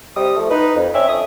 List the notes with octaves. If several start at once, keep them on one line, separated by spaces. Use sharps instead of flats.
C3 G3 D#6
F3 A3
D#4 B4
F2
C4 C#4 C#5 D5 E5
F2 D4 E5 D#6